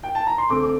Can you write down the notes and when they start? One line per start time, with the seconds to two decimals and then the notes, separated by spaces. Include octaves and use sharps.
0.03 G5
0.15 A5
0.27 A#5
0.38 C6
0.50 D3 A3 C4 D6
0.63 D6